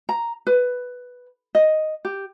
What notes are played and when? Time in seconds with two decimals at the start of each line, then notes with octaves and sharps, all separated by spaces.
0.09 A#5
0.47 B4
1.55 D#5
2.05 G4